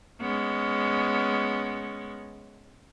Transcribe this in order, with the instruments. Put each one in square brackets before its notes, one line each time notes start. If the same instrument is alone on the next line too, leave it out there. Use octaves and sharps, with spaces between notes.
[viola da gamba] G#3 B3 C#4